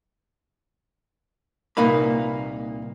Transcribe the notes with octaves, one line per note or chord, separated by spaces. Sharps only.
C2 A#2 A#3 D#4 B4 B5